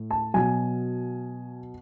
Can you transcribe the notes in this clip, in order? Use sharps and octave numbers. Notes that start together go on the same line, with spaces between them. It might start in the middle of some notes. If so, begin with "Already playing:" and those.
Already playing: A2
A5
B2 F#3 G#5